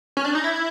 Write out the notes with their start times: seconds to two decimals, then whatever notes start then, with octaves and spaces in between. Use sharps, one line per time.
0.17 C#4
0.25 D4
0.35 D#4
0.44 E4